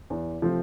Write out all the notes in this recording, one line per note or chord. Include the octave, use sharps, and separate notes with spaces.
E2
C3 F3 A3 C4